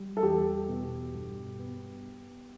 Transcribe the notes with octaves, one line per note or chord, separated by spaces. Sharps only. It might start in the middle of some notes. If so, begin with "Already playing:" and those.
Already playing: G3
A4
E2 G4
B2
G2
B3